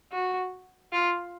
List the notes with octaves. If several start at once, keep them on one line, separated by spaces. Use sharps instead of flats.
F#4
F4